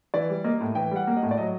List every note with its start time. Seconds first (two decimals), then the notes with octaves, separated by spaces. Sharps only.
0.14 E3 D5
0.30 G3
0.44 A#3 D#5
0.61 A2
0.75 E3 G5
0.91 G3 F#5
1.07 A#3
1.16 D#5
1.23 A2
1.31 D5
1.38 F#3 D#5